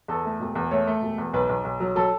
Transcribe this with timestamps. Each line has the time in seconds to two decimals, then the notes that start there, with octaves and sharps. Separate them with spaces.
0.08 E2 A4
0.25 A3
0.40 E1
0.55 E2
0.71 A3 C#5
0.87 A3
1.02 E1
1.18 E2
1.33 B1 B4
1.49 B1
1.64 B1
1.80 F#3
1.96 F#3 A4